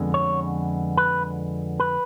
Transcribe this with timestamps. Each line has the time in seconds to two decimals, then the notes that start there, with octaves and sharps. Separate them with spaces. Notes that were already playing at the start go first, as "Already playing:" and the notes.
Already playing: F2 D3 G#3 B3
0.14 C#5
0.97 B4
1.80 B4